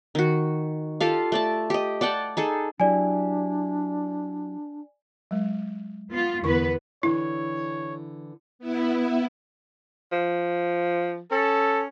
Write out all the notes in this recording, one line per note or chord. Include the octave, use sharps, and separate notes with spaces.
D#3 F#4
F4 G4 A4 F5
A3 D5 A5
G4 D#5
D5 F#5 G5 A5
D#4 G#4 A4
F#3 D4 E4 G4 D5 G#5
F#3 G#3
B3 F4
E2 D3 B3 E4 B4 C#6
D3 E3 E4 C#5
B3 E4
F3
C#4 A4